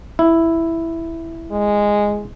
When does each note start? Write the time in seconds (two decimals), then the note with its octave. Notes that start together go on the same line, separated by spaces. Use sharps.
0.19 E4
1.51 G#3